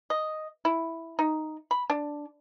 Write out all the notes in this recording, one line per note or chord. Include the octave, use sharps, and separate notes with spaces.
D#5
E4
D#4
B5
D4